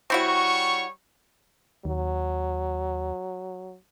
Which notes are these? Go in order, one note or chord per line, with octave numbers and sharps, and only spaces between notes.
G3 C4 E4 F#4 C#5 C#6
D#2 F#3